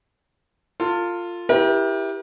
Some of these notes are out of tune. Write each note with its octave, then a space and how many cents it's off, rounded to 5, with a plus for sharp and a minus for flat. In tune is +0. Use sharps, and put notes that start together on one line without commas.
F4 +0 A4 +40
E4 +0 G4 +5 A#4 +40